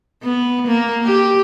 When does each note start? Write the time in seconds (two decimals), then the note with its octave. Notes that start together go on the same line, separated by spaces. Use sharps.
0.23 B3
0.67 A#3
1.04 G4